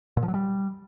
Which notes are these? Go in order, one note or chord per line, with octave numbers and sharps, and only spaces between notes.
A#2
F3
F#3
G3